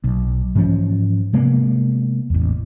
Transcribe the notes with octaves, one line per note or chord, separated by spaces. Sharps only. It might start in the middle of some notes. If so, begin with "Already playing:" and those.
B1
G#2 E3 F3 C#4
C3 G#3 A#3 B3
A1 E2